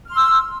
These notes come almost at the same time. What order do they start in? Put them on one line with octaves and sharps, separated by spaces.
F6 C6 E6